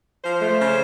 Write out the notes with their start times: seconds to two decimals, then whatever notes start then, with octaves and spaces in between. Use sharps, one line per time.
0.25 F3 C5
0.42 A3
0.59 C#3